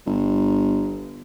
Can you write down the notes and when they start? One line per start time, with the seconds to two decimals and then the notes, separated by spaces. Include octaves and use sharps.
0.06 G1